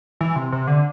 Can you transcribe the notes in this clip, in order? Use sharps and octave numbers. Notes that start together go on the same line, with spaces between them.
E3
C3
C3
D3